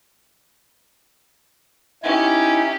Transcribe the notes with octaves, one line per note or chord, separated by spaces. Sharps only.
C#4 D#4 E4 G4 G#5